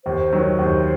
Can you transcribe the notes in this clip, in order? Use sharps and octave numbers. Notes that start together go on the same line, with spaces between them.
D#2 C5
D#3 F#3
D#2 C5